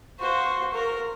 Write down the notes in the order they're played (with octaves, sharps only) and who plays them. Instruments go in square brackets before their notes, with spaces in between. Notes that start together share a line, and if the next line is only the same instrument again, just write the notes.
[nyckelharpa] F#4 C5 [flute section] F5 C#6
[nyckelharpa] A#4